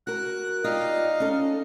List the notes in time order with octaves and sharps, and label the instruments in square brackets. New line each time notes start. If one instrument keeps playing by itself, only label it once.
[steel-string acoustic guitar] F#4 A#4 [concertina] F#6
[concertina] D#4 D#5 F5 [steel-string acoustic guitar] F4 G4 D5
[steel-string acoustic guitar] C#4 A4